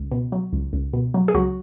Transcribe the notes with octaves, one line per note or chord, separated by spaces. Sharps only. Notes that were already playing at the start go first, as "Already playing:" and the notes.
Already playing: C#2
B2
F#3
C#2
C#2
B2
F#3
G#4
C#2 F#3 F#4